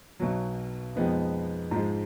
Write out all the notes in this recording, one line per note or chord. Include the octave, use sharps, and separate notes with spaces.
B1 B2 F#3
F2 F3 G#3 B3 D#4
G#2 F3 G#3